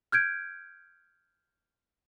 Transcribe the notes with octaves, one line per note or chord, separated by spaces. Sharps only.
F6 G6 G#6 D7